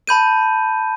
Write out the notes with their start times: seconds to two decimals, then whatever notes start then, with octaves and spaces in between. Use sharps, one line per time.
0.07 A5 B5 G6 D#7